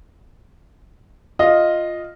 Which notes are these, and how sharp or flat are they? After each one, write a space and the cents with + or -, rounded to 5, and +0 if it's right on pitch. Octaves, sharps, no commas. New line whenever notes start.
F4 +0 D#5 -5